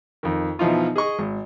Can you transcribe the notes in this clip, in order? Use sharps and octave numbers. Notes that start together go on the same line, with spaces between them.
F2 D#3
B2 E3 F3 D#4 F4
G#4 D#5 C#6
G#1